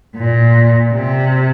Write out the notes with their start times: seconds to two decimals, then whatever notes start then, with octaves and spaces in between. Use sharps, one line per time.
0.16 A#2
0.93 C3